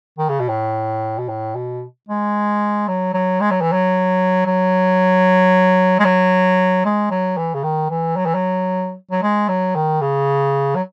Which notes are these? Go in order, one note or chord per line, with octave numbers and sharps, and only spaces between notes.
D#3
C#3
B2
A2
B2
A2
B2
G#3
F#3
F#3
G#3
F#3
E3
F#3
F#3
G#3
F#3
G#3
F#3
E3
C#3
D#3
E3
F#3
E3
F#3
F#3
G#3
F#3
D#3
C#3
F#3